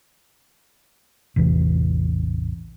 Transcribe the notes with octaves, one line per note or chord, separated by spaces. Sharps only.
A1 E2 C3 E3